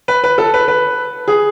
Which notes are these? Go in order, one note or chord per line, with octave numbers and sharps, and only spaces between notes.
B4
B4
A4
B4
B4
G#4